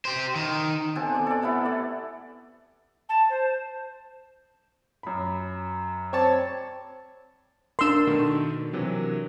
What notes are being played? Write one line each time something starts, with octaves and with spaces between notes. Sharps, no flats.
G4 C5
D#3
B2 C4 A4 G#5
D5 G#5
A4 D5
C3 A3 B3 E4
D5
A5
C5
F#2 B5
C4 C#5 D5 A5
D4 A#4 C6 E6
B2 D#3 A3
C3 E3 F#3